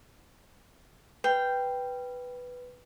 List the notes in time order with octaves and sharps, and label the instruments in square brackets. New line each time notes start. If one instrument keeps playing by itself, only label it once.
[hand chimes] B4 [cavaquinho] G5